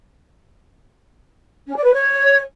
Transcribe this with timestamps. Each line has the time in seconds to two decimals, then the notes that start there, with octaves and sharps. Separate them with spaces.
1.67 C#4
1.76 D5
1.85 B4
1.94 C#5